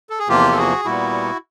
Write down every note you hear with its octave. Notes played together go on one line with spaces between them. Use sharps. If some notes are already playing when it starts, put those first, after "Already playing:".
A4
G#4
E2 C3 F3 A#3 F4 G4
A4
F#4 G#4
A#2 G3 B3 E4 F#4